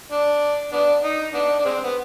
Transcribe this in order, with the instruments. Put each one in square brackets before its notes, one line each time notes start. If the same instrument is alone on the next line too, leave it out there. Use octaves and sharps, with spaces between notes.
[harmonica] D4
B3 D4
D#4
B3 D4
D4
G#3 C4
B3